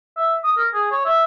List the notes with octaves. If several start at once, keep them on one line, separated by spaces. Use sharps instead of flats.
E5
D#6
A#4
G#4
C#5
E5